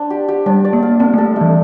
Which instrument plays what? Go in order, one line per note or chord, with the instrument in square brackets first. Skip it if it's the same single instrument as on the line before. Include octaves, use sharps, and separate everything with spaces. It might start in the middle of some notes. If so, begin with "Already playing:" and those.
Already playing: [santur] D4 C5
G4
G4
[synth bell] G3 [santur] D4
[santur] D5
[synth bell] A#3
[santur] F5
[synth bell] C4 [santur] D4
[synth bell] A3 [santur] A4
[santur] A3
[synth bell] E3